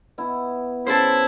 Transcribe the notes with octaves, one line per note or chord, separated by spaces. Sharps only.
B3 E4
C#3 E4 C5 A5